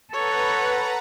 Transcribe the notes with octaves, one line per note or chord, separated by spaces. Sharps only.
A4 B4 C#5 F#5 A#5